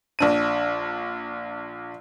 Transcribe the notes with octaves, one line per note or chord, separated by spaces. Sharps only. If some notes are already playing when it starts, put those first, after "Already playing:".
A#1 D4 D#7